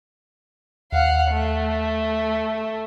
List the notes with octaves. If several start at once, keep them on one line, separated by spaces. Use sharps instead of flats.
D#2 F5 F#5
A3